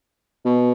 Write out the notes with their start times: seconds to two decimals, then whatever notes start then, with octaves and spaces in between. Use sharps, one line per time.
0.45 B2